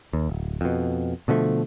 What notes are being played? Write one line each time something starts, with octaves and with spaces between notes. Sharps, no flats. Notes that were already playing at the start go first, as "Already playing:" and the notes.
D#2
D1
F2 B2
B2 D3 F3 A3